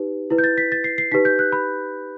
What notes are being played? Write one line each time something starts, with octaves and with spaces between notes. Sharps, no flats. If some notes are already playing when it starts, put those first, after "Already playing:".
Already playing: D#4 G4 B4
E4 B4
G6
A6
B6
A6
C7
C7
D#4 G4 B4 B6
G6
F#6
B5